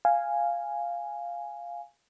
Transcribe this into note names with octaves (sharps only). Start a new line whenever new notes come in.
F5 G#5